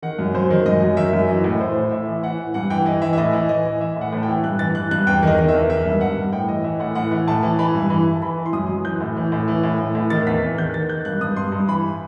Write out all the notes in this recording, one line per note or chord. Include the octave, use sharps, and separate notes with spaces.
D#3 F#5
F#2
F#2 C5
D#3
F#2 D#5
F#2
D#3 E5
F#2
E3 D#5
A2
A2 C5
A2
A2 E5
E3
E3 F#5
E3
G2 F#5
E3 G5
E3 D#5
E3 E5
E5
A2 D#5
E3
E3 D#5
E3
E3 E5
A2 F#5
A2
A5
G5
E3
G2 F#6
E3 A6
E3 F#6
G2 F#6
E2 G5
D#3 D#5
D#3
E5
E2
D#3 E5
G2
G2 F#5
G2
A2 G5
E3 D#5
E3 E5
A2 F#5
A2 F#5
E3
A2 A5
E3
E3 B5
G2
E3 B5
E3
A5
E3 B5
E3
C6
F#2 D#6
F#2
E3 G6
A2
E3
A2
E3
A2
A2
A2
D#3 A6
E2 B6
E2
D#3 G6
D#3 A6
D#3 G6
G2 F#6
G2 D#6
G2 C6
G2
E3 B5